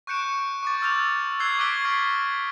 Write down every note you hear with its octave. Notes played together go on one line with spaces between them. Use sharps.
C#6 F#6 G6 C#7 D7 E7
C#6 D6 A6
E6 F6 G6 A6 F7
E6 F#6 G#6 A6 C7 G7
C#6 D6 F#6 B6 D7 G7
C#6 F6 G#6 A#6 C7 D7